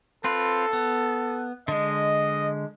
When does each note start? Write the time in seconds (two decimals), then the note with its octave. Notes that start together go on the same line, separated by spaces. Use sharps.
0.24 C4 F4 A4 B4
0.73 B3
1.68 D3 G#3 D#5